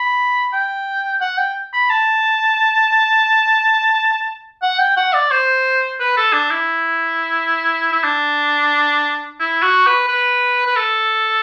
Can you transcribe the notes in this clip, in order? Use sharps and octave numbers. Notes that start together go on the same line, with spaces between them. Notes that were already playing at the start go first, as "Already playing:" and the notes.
Already playing: B5
G5
F#5
G5
B5
A5
F#5
G5
F#5
D5
C5
B4
A4
D4
E4
E4
D4
E4
F#4
B4
B4
B4
A4